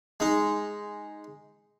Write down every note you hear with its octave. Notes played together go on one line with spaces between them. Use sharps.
G#3 D#4